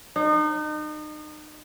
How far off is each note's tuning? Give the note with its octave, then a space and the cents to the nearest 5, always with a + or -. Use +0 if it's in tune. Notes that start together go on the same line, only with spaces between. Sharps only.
D#4 -35